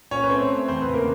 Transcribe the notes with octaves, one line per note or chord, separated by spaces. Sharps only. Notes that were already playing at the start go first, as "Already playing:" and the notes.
A#2 C#4 C#5
B4
A3 C4 C5
A3
E2 C4 C5
B3 B4
C#3
A#3 A#4